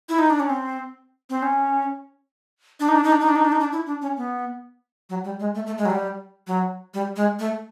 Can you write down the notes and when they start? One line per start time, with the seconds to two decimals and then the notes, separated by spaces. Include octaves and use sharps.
0.09 E4
0.19 D#4
0.30 D4
0.40 C#4
0.50 C4
1.30 C4
1.42 C#4
2.80 D4
2.88 D#4
2.95 D4
3.04 D#4
3.12 D4
3.20 D#4
3.28 D4
3.36 D#4
3.45 D4
3.52 D#4
3.60 D4
3.72 E4
3.86 D4
4.02 C#4
4.17 B3
5.09 F#3
5.24 G3
5.40 G#3
5.55 A3
5.66 A3
5.78 G#3
5.85 F#3
5.90 G3
6.47 F#3
6.94 G3
7.16 G#3
7.39 A3